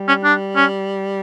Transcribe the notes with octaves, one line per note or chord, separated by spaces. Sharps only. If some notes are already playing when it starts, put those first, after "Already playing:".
Already playing: G3
C#4
D4
C#4